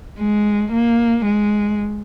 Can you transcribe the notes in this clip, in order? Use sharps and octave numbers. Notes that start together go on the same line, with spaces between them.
G#3
A#3
G#3